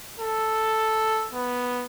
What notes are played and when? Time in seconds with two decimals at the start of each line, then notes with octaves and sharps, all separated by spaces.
0.20 A4
1.33 B3